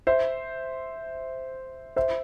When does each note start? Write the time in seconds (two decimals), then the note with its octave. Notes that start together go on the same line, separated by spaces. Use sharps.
0.07 C5 E5
1.96 C5 E5